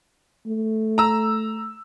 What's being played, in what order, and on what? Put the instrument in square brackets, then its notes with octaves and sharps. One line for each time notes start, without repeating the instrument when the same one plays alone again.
[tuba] A3
[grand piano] A#5 E6